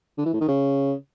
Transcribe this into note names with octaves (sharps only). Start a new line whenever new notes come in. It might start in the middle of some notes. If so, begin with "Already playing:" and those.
D3
E3
A2
D#3
C#3